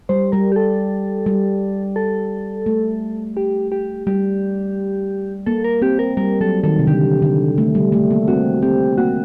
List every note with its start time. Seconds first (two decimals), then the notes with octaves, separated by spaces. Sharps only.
0.09 G3 C5
0.32 G3 A#4
0.52 G4
0.56 A4
1.26 G3
1.96 A4
2.66 A3
3.37 G4
3.72 G4
4.07 G3 G4
5.46 A#3 A4
5.64 A#4
5.82 C4 G4
5.99 A#4
6.17 G3 A#4
6.41 F#3 A4
6.64 D#3 A4
6.79 C3
6.87 D3 G4
7.22 D3
7.58 A3
7.75 G3
7.92 A3
8.11 A#3
8.28 C4 F#4
8.62 C4 G4
8.98 A#3 F#4